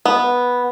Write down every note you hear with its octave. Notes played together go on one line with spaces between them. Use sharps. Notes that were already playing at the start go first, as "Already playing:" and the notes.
B3